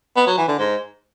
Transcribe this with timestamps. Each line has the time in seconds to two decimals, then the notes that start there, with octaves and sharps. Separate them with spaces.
0.16 B3
0.27 F#3
0.37 E3
0.48 D3
0.58 G#2